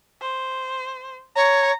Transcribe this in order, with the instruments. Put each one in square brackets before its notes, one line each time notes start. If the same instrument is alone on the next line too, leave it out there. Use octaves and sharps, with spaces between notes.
[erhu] C5
[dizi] C#5 [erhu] A#5